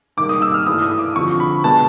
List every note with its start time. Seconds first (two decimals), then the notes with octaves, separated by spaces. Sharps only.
0.17 G#2 D#3 G3 A#3 D6
0.29 D#6
0.42 E6
0.54 F6
0.67 G2 E3 A3 D#6
0.83 D#6
0.99 D6
1.16 F2 D3 F3 C#6
1.40 B5
1.64 B2 G#3 B3 A5